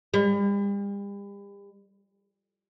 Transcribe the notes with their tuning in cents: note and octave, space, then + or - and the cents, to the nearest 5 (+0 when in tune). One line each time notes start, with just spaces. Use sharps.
G3 +40